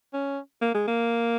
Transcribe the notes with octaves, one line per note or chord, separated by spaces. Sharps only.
C#4
A#3
G#3
A#3